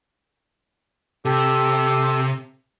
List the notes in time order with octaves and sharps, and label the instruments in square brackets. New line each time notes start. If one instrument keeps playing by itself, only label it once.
[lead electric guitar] C3 [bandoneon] G4 A4